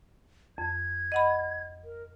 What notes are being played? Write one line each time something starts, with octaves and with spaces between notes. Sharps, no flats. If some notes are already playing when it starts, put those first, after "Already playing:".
F2 G#6
D#5 F#5 B5
A#4